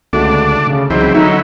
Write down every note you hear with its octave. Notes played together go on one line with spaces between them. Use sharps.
C#2 D3 A3 D4 F#4
C#3
C#2 E3 F#3 G#3 C4 D#4
D3 F#3 D#4 E4 E5